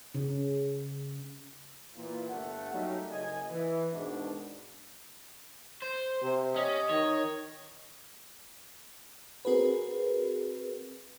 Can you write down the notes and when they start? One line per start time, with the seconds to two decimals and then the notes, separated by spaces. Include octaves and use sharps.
0.15 C#3
1.95 A#2 E3
2.29 G1 G2 A3 F#5
2.73 F#3 G3 A3 A#3 C#4 D#4
3.11 F#1 D#5 G#5
3.50 E3
3.92 G#2 B2 D#3 D4
5.82 C5
6.22 C3
6.56 C#4 D#5
6.90 D#3 C#5
9.45 C4 F#4 G#4 A#4 B4